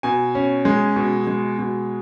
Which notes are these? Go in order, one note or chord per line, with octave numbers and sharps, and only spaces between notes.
B2 G#5
C#4
G#3
B2
G#3
B2